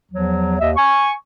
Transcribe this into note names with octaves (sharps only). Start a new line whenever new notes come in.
E2 F3 F#3
D#2 D#5 E5
G#5 C#6